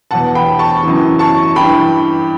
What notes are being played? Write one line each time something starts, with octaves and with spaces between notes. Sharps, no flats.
E2 B2 F#5 A5
G5 B5
A5 C#6
F#2 C#3 E3
A5 C#6
G2 E3 G5 B5